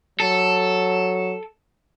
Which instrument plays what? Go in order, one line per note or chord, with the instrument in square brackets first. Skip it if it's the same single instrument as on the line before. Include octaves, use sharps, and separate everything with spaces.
[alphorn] F#3 [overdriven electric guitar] A4